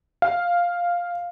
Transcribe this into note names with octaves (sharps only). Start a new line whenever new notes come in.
F5